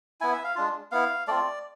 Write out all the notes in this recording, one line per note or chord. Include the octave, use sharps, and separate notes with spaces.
B3 E4 G#5
E5
F5
G#3 D4 F4
B3 E4 F5
A3 C4 F4 D5